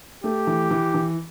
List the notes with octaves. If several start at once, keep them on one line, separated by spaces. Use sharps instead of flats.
A3 G4
E3
E3
E3